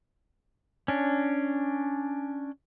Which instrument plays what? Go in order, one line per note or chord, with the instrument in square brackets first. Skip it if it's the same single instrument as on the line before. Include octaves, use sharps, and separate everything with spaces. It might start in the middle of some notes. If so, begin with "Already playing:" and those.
[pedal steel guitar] C#4 D4